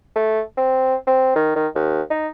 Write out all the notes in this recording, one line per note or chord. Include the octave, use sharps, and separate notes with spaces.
A3
C4
C4
D#3
D#3
D#2
D#4